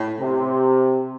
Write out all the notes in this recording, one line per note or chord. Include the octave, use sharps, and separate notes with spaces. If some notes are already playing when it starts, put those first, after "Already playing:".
Already playing: A2
C3